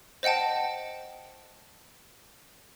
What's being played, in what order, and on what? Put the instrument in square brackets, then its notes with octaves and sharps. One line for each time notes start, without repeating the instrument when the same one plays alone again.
[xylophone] C5 D#5 F#5 G5 A5